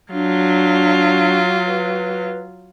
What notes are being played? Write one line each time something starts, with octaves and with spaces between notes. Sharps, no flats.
F#3 D4 F4
B4